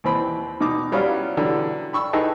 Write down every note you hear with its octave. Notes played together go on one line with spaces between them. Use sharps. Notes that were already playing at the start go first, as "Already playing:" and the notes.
D#2 E3 C4 B5
B2 D#4 D6
F#3 G3 B3 C#4 E4 F4
D3 E3 F#3 G3
B5 C#6 E6
D#4 G#4 A4 B4 D#5 G5